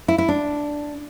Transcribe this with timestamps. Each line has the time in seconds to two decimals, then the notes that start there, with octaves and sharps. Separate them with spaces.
0.08 E4
0.18 E4
0.29 D4